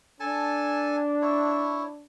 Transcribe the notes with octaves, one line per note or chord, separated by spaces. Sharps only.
D4 A4 G#5 A5
E4 C#5